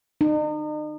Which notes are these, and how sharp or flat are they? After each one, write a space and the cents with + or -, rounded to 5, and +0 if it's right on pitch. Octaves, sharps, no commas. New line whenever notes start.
D#4 -40